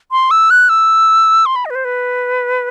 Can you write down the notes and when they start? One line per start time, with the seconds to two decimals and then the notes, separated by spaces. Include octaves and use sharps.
0.12 C6
0.31 E6
0.50 F#6
0.69 E6
1.46 C6
1.56 B5
1.65 D#5
1.70 B4
1.75 C5
1.85 B4